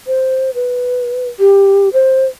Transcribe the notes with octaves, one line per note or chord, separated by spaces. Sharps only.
C5
B4
G4
C5